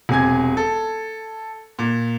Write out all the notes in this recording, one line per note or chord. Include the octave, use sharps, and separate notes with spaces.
E1 C3 G#5 G#6
A4
A#2